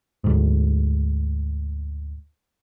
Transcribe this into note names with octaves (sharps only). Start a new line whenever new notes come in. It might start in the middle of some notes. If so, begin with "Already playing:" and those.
D2 G#2